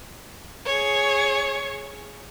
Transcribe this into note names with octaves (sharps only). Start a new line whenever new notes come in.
G#4 C#5